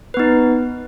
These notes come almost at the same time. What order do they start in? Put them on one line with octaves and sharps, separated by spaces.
B4 B3 D#4